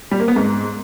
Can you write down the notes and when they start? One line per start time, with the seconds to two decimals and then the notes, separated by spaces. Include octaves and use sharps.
0.11 G3
0.20 A#3
0.28 B3
0.36 G#2